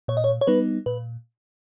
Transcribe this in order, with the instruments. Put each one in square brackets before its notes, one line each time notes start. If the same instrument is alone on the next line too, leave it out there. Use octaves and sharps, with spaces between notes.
[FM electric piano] A#2 C#5
D#5
C#5
C#5
G3 B3 D#4 B4
A#2 B4